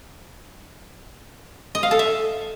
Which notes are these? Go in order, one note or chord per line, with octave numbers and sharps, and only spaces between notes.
D#5
F5
A4
E5